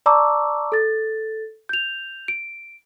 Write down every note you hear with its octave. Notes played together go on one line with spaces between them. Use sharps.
D5 A5 A#5 C#6 D6 E6
A4 A6
G6 F7
D7